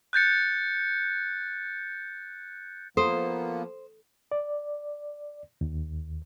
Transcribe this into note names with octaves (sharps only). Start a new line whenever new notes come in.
F#6 G6 A6 C#7
F3 A#3 B3 A4 C5
D5
D#2